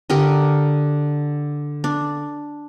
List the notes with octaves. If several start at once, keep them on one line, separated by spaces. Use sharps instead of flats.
D3 G4 A#4 D#5
D4